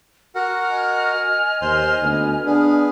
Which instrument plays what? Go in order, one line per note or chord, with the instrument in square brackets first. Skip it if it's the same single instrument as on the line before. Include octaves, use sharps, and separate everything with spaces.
[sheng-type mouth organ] F#4 A#4 F#5 [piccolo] F6
[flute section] D#5 G#5
[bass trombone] D#2 [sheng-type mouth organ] C5 C6
[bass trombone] D2 [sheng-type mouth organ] B3
[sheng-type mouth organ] B3 G#4 [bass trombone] D4